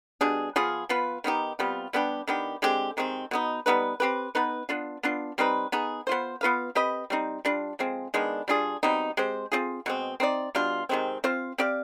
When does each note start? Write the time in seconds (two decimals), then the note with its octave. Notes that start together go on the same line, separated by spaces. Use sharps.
0.21 B2 G3 D4 G#4
0.56 F3 B3 F4 G#4
0.89 F3 B3 F4 B4
1.24 D#3 B3 D#4 G4
1.59 C3 G3 B3 F4
1.93 G3 B3 D4 G4
2.27 D#3 B3 D4 G4
2.62 D3 G#3 C4 G4
2.97 C3 D#3 G#3 C4
3.31 B2 B3 D#4
3.66 G3 B3 D#4 B4
4.00 C4 G4 B4
4.35 B3 D#4 B4
4.69 B3 D4 F4
5.03 B3 D4 F4
5.38 G3 C4 D#4 B4
5.72 B3 D#4 G#4
6.07 B3 F4 C5
6.41 B3 F4 B4 F5
6.75 C4 G4 B4 D#5
7.10 G3 C4 D#4
7.45 G3 D4 F4
7.79 F3 G#3 C4
8.14 D#3 G#3 B3 D4
8.48 G3 D4 F4 G#4
8.83 B2 G3 C4 D#4
9.17 G#3 C4 G4 C5
9.52 C4 F4 G#4
9.86 B2 G#3 C4
10.20 C4 D#4 B4 D5
10.55 B2 G3 D4 F4
10.89 C3 D#3 G#3 C4
11.24 C4 F4 C5 F5
11.58 C4 G4 D5 F5